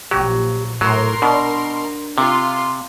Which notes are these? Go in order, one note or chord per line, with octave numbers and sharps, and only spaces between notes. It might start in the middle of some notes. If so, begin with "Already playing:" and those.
A#1 F#3 G4
A2 F#3 A#4 C6
B2 D4
C3 F4 C6